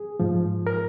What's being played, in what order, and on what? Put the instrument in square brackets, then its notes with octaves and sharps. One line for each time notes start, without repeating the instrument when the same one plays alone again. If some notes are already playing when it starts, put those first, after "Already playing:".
Already playing: [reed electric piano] G#4
G#2 F3
A#4